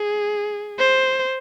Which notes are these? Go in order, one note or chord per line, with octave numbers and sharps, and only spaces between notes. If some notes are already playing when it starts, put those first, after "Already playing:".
Already playing: G#4
C5